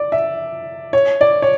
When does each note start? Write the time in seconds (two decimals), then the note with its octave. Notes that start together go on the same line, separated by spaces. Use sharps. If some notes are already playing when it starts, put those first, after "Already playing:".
Already playing: D5
0.12 E5
0.93 C#5
1.21 D5
1.42 C#5